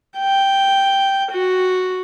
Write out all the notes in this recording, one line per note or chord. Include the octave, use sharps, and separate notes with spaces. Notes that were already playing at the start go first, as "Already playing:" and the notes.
G5
F#4